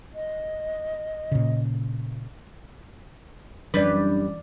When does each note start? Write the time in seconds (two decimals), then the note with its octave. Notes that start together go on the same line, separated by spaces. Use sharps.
0.15 D#5
1.32 A#2 C#3
3.74 F#2 E3 G3 D4 B4 D5